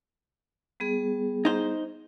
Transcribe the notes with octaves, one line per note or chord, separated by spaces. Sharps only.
G3 B3 G#4
D#4 C5